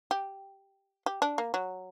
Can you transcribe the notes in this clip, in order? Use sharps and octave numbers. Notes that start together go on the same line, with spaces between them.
G4
G4
D4
A#3
F#3